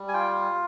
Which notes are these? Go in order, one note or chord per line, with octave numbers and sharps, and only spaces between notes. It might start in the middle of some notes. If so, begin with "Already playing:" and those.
Already playing: G3
G#5
F4 G5